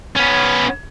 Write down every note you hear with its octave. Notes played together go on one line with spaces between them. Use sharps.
B3 C#4